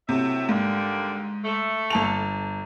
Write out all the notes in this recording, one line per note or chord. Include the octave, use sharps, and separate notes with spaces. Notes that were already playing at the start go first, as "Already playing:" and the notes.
A2 C3 F#3 E5
G#2 D3 G3 A#3
A3
G1 A5 F7